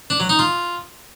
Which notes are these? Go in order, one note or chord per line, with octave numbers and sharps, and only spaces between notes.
D4
F#3
D#4
F4